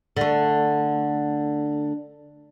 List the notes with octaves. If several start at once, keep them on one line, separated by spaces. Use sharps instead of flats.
D3 A3